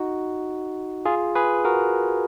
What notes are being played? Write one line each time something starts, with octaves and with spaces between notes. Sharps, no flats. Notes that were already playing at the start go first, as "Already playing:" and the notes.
Already playing: D#4 F#4
F4 G#4
G#4 B4
F#4 A#4